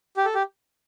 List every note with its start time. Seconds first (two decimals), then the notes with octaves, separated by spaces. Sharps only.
0.17 G4
0.25 A4
0.35 G4